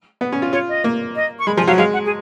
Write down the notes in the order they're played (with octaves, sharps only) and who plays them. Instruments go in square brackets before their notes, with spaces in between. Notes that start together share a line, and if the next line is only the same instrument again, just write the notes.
[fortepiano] B3
C#4
F4
[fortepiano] F4 [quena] C#5
[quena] D#5
[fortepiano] A#3
[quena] D#5
C#6
[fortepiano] G#3 [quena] B5
[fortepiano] F3 [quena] G#5
[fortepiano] F#3 [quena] F5
[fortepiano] G#3 [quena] F5
[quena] F#5
G#4